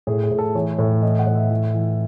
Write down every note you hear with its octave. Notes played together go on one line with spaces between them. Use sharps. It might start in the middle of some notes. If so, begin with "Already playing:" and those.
A2 G#4
G#4
A2
A4
E3 C#5
A2
E3 D#5
F#5
A2
E5
E3
E3